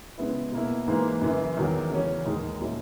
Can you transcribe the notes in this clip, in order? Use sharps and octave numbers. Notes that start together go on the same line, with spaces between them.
C#3 G#3 B3 E4
B2 A#3 E4
G#2 E3 A#3
F#2 C#3 E3
E2 D#3 F#3
E2 C#3 F#3 C#4
D#2 D#3 G#3 D#4
A#2 F#3 C#4 E4